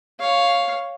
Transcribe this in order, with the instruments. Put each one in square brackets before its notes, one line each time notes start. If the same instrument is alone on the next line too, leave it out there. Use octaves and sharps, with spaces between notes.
[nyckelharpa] C#5 F5